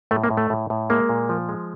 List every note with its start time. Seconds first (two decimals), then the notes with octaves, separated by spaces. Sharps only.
0.11 A2 A3
0.24 A#3
0.30 A2
0.37 A3
0.50 A2
0.70 A2
0.90 G#3 A#3
1.09 A#2
1.29 F3
1.49 G#3